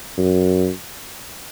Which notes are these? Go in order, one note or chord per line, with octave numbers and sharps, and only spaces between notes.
F#2